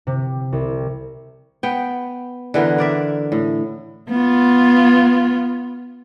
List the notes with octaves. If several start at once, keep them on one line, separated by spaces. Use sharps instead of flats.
C3
C2
B3 G5
D3 E3 B3 A#4
A#4 D5 E5
A2
B3 F4